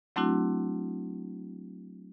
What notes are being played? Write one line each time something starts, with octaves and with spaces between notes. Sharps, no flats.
F#3 A3 C4 D4 E4 F#4